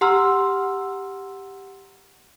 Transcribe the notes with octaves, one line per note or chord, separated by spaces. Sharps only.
G4 F#5 A#5 C6 E6 F6